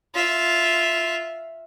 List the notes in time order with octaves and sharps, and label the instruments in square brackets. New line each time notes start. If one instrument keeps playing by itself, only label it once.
[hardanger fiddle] F4 E5